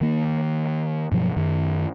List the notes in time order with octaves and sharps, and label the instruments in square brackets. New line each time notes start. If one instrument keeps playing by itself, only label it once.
[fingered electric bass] D#3 A#3
G2 B2 F3 F#3
F#2 D#3